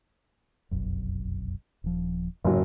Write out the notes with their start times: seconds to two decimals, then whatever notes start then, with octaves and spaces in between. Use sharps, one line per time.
0.71 F1 B1 F#2
1.84 D#1 F3
2.45 F#1 F2 G#2 F#3